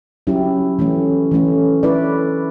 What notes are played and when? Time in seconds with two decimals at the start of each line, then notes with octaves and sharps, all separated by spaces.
0.27 F#3 C#4 E4 G4
0.79 E3 A3 C#4
1.31 E3 A3 C#4
1.83 A3 E4 B4 D5